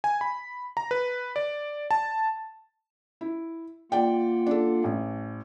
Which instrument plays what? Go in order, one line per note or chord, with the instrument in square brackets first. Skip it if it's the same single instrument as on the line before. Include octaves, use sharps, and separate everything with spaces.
[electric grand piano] G#5
B5
A#5
B4
D5
A5
[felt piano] E4
[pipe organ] A#3 F4 F#5 [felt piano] D5 G5
[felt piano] D4 A4
A1